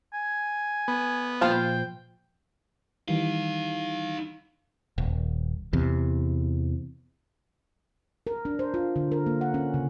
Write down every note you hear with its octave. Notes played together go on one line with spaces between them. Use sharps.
G#5
B3
A#2 F3 F4 C5 F5 G5
D#3 E3 G3 D#4 F5
D#1
E2 C3
A#4
D4
C5
F4
D3
A#4
A#3
F#5
C#4
C#3